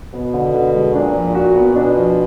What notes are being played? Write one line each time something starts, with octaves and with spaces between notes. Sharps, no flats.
B2 B3
D3
D3
G#3
A#2 D4
F3
F#4
B3
B2 D4
F3